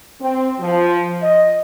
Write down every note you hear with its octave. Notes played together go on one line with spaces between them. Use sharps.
C4
F3
D#5